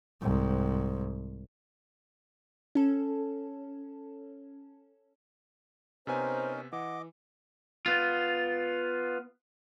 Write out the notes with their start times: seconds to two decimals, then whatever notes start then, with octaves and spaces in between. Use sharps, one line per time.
0.21 C2 G#2
2.75 C#4 A4
6.07 C3 B3 C#4 D#4 A#4 C5 G#5
6.73 E3 D#5 F#5 D6
7.86 B3 F4